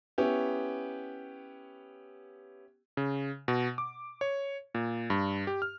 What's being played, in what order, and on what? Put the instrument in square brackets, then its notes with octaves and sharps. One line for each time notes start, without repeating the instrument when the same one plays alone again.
[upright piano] B3 C#4 E4 G4
[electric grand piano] C#3
B2
D6
C#5
A#2
G2
G4
F6